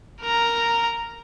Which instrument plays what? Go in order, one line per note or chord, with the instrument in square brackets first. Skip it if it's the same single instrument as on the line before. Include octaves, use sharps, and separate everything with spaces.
[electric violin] A#4 A#5